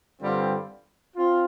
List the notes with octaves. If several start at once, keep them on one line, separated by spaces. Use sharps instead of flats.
G2 D3 G3 C4 F4
C4 F4